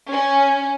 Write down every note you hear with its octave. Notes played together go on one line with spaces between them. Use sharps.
C#4